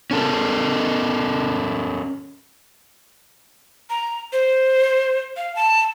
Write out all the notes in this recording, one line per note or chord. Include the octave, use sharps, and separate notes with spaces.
C#4 A4 A#4
A#5
C5
F5
A5